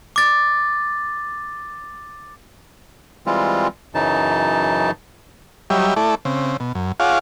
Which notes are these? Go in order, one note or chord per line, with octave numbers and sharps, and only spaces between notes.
D6 A6
E3 G3 G#3 C4 F4
F#2 C#3 E3 F#3 D#4 A5
F#3 G3 G4 C#5 D#5 E5
A3 E4 A4 D5
C#3 C4
B2
F#2
F4 G#4 C#5 F5 F#5 D6